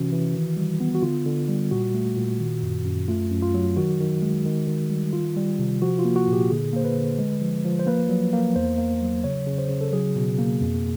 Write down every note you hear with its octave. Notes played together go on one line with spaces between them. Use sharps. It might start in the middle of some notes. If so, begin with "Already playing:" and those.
Already playing: C3 E3 C#4 F#4
E3
D#3
G3
B3
F#4
D3 F4
D3
G3
A#2 F#4
A3
A#2
D#3
F#2
F#2
A3 F4
F#2
F4
F#3
D#3 F#4
D#3
G#3
D#3
D#3
G3
D#3 F4
G3
C3
F3 F#4
F4
A#3
F#4
A#2
G4
D3 G#4
A#3 C5
B4
D3
G#3
F3
F3
C5
A#3 B4
F#3
A#3
E2 C5
A#3
F#3
C#3 C#5
C#3
C5
C#3
A4
F#3 G#4
B2
A#3
F2